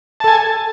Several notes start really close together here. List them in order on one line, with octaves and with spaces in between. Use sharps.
A5 A4 G#5